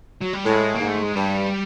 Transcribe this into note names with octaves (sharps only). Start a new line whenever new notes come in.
F#3
G3
A2 G#3
A#3
G#2
A3
G#3
G2 G3